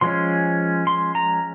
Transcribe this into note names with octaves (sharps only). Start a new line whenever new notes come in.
F3 G#3 C#4 C6
C6
A#5